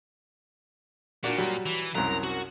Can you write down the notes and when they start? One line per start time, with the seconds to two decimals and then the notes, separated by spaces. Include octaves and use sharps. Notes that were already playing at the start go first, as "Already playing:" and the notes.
1.24 A#2 A#3 D4 F#4
1.38 F#3 G3 F#4
1.66 E3
1.95 C2 F#2 A#5
2.23 F#4